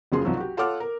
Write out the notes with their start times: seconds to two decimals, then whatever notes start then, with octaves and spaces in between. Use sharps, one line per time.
0.12 F#1 C#3 F3 G#4 C6
0.24 C2 F3 F#3 D#4
0.37 F#4 G4
0.57 F4 A4 C#5 F#5 D6 F6
0.80 A#4